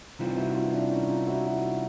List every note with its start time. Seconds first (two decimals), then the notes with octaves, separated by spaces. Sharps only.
0.19 C3 E3 G3 C4 D#4 F4
0.37 E4 F#4
0.55 D#4 F4
0.73 D4 E4
0.91 C#4 D#4
1.10 D#4 F4
1.27 E4 F#4
1.46 E4 F#4